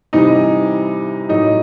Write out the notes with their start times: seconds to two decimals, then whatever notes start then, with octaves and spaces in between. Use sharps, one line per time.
0.13 C3 E3 G3 D#4 D#5
1.29 A2 F#3 D#4 D#5